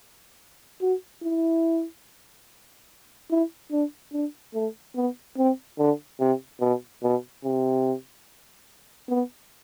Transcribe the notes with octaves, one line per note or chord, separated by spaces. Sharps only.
F#4
E4
E4
D4
D4
A3
B3
C4
D3
C3
B2
B2
C3
B3